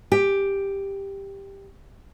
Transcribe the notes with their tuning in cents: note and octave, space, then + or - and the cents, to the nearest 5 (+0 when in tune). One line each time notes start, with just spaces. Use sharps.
G4 +5